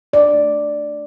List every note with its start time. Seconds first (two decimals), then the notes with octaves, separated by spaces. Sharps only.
0.13 D4 D5
0.34 A3